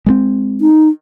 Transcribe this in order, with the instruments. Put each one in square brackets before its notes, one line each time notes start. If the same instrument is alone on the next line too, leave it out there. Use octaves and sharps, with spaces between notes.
[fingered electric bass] G#3 A3 C4
[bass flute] D#4